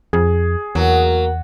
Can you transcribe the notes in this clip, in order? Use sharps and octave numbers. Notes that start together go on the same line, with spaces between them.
F2 G#4
E2 F#3 A#3 F#4 A#4